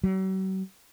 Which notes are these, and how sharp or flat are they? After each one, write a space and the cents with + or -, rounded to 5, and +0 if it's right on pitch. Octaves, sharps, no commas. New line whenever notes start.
F#3 +45